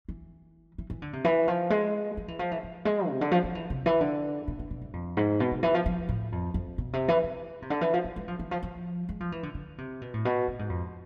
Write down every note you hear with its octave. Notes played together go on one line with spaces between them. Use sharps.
E3
E3
E3
D3
C3
E3
F3
G#3
F3
E3
F3
E3
F3
G#3
C3
D3
F3
F3
E3
C3
E3
D3
B2
B2
B2
G#2
F2
G#2
B2
C3
E3
F3
F3
A2
F2
F2
B2
C3
E3
E3
C3
D3
E3
F3
F3
G#3
F3
E3
F3
F3
G#3
F3
E3
D3
D3
C3
B2
A2
B2
A2
G#2
F2